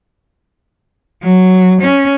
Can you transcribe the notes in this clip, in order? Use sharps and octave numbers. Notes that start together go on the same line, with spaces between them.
F#3
C#4